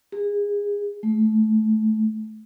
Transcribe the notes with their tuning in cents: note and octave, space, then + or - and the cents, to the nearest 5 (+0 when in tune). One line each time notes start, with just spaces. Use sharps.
G#4 -25
A3 -20